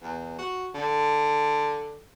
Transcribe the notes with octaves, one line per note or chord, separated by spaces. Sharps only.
E2
F#4
D3